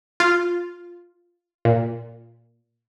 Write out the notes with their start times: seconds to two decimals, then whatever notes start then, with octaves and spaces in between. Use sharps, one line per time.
0.20 F4
1.65 A#2